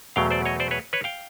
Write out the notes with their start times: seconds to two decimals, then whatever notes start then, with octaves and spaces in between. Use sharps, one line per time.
0.16 E2 B2 F#3 A3 F5 G5
0.31 C5 D5
0.45 C#5 D#5
0.60 C5 D5
0.71 B4 C#5
0.93 B4 C#5
1.04 F5 G5